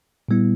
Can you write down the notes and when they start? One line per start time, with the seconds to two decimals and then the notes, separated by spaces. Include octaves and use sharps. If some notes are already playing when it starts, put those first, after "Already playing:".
0.28 A#2 G3 B3 E4